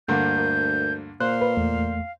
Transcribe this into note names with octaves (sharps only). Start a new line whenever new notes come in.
D2 G2 D3 A#3 G6
A#4
A#2 C5 F5 F#6
B4
E2 A3